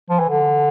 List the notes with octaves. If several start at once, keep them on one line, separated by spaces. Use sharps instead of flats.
F3
E3
D3